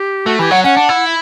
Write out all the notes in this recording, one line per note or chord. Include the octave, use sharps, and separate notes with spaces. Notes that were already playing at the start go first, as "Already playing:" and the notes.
Already playing: G4
A3 F#4
E3 G4
F#3 F#5
C#4 F#5
D4
E4